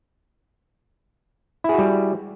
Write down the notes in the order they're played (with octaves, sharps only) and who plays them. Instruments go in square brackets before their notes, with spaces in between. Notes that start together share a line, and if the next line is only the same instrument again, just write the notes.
[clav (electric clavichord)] E4
G#4
F#4
G3